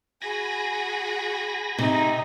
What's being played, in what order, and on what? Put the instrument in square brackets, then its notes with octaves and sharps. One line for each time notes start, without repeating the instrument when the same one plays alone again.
[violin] F#4 G#4 [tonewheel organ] G#5 B5 A#6
[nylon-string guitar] C3 [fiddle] D#4